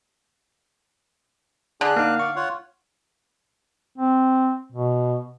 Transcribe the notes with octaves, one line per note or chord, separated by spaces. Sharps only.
D3 D4 G#4 F#6
A#3 D#4 F5
D5 C#6
F4 C#5 F#5
C4
B2